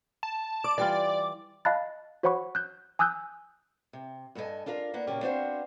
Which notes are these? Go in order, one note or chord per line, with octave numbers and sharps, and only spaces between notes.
A5
D5 D6
E3 G3 F4 D5
D#5 F5 A5 B5 F#6 A6
F#4 C5 C#5 F#5 B5 C#6
F#6 G6
G#5 D#6 E6 F#6 G6
C3
G2 F#4 A4 A#4 D#5 G#5
D4 F4 A#4 F5
A#3 B3 D4
A#2 C#3 F#3 A#3 C#4 G4
B3 C4 D4 F#4 C5 F5